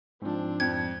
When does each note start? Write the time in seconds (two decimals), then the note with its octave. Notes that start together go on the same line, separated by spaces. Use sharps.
0.22 G#2 F3 C4 D4
0.60 F2 G#6